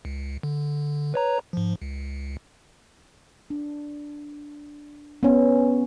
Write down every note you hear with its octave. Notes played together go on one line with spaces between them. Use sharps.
C#2
D3
B4 C#5 A#5
G#2 F3
C#2
D4
B3 C#4